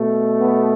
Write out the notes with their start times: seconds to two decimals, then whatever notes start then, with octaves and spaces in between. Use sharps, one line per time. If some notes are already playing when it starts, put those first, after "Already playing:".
Already playing: B2 A3
0.38 B3